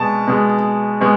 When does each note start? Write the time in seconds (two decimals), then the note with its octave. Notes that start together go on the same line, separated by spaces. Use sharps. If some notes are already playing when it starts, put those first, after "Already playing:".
Already playing: B2 G#3 A5
0.27 B2 G#3
1.01 B2 G#3